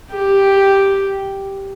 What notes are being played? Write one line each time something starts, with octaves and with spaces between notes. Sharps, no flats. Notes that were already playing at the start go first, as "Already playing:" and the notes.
G4